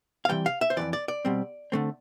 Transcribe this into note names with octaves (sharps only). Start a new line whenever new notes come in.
F5
C3 E3 G3 G5
F5
E5
C5
F2 C3 E3 D5
D5
D5
B2 G3 C4
D3 A3 C4